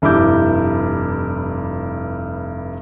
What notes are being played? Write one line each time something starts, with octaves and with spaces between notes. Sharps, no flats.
F1 G2 E4 E5 D6 G6